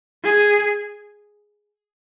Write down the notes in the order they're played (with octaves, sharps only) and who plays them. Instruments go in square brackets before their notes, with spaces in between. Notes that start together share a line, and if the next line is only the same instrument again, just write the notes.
[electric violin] G#4